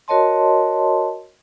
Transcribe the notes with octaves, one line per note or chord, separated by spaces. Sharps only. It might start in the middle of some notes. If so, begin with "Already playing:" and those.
F#4 A#4 C#5 D#5 A5 C6